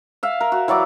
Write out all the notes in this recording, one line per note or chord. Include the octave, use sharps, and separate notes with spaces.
E5 F5
A#4
F#4
E3 F#3 D5 D6